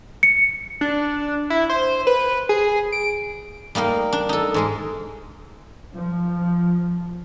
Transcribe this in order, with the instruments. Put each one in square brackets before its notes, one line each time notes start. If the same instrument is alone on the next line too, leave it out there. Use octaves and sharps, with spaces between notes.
[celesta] C#7
[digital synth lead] D4
E4
C5
B4
G#4
D7
[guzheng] G3 A#3 D#4 A#4
D4
D#4 A4
G#2 G#3 A#4
[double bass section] F3